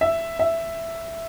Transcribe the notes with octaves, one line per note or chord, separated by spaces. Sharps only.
E5
E5